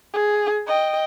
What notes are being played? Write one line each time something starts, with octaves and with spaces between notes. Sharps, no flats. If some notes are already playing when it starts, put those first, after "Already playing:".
G#4
D#5 G5